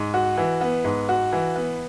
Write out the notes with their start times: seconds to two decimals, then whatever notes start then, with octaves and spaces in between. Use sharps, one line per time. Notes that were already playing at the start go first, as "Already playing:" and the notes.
Already playing: G#2
0.14 F#4
0.38 E3
0.61 B3
0.85 G#2
1.09 F#4
1.33 E3
1.56 B3